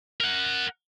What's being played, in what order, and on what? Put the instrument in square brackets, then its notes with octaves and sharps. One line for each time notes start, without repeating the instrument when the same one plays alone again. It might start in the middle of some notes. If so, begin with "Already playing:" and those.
[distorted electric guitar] A#4 F#5